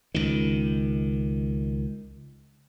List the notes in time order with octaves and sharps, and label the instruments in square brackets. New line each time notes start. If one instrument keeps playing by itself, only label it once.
[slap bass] C#2 D#3